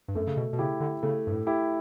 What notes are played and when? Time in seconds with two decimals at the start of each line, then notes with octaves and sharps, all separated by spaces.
0.08 G2
0.15 F#2 A3
0.27 C#3
0.36 B2
0.53 B2
0.59 C#3 E4 G4
0.80 D3
1.03 C#3 A3
1.27 G2
1.32 A2
1.47 E4 G4